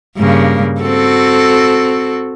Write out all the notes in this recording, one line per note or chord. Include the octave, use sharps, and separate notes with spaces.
G2 C#3 A#3
C4 F#4 A4